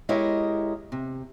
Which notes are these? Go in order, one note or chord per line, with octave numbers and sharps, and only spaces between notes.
G#3 E4 G4 A#4 C#5 D#5
C3